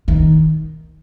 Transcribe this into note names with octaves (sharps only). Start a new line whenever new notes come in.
D#3